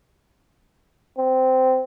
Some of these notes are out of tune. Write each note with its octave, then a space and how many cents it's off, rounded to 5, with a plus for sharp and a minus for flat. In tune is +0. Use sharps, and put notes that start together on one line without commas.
C4 -15